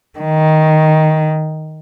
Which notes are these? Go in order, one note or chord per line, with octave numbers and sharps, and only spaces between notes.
D#3